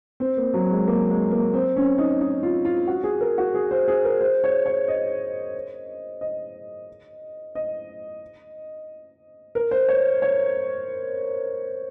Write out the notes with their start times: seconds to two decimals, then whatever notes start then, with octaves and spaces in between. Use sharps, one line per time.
0.20 C4
0.37 A#3
0.54 F#3
0.71 G#3
0.88 A#3
1.10 G#3
1.31 A#3
1.54 C4
1.76 C#4
1.98 D#4
2.21 D#4
2.43 F4
2.65 F4
2.88 F#4
3.04 G#4
3.21 A#4
3.38 F#4
3.55 G#4
3.71 C5
3.88 G#4
4.05 A#4
4.21 C5
4.44 C#5
4.66 C#5
4.88 D#5
6.21 D#5
7.55 D#5
9.55 A#4
9.71 C5
9.89 C#5
10.22 C#5